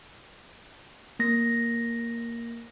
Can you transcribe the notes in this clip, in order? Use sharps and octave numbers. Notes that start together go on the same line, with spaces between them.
A#3 A#6